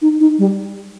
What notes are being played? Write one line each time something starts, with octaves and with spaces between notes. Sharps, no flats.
D#4
D#4
G3